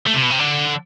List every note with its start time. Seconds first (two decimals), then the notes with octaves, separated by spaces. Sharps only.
0.07 A3
0.14 C3
0.23 B2
0.30 C3
0.39 D3